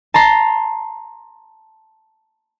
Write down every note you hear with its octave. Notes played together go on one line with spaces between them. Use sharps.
A5 A#5 C6